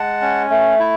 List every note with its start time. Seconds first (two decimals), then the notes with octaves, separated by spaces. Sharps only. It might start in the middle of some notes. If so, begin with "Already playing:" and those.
Already playing: G#3 F#5 A5
0.22 C#4
0.50 A3
0.80 E4